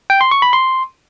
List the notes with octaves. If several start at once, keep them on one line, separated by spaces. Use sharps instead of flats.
G5
C6
C#6
B5
C6